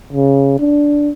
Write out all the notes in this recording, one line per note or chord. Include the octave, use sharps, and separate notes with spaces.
C#3
D4